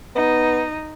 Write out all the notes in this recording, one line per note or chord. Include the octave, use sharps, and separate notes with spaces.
B3 D#4